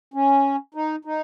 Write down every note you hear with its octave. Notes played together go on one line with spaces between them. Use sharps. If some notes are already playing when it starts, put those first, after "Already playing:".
C#4
D#4
D#4